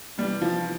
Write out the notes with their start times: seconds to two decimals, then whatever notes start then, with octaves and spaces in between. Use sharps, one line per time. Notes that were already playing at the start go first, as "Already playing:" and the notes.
0.18 C3 E3 G3 B3 D4 G4
0.42 F3